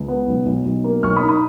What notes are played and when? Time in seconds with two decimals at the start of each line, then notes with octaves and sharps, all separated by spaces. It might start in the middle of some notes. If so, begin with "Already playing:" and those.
Already playing: C#2
0.08 B3
0.27 B1
0.46 B1
0.65 B1
0.84 A#3
1.03 B1 C#6 F6
1.16 B5 D#6
1.22 D#4
1.29 B5 D#6